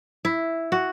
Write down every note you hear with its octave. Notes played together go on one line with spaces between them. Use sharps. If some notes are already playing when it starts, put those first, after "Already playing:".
E4
F#4